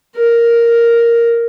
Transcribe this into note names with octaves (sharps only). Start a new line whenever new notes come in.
A#4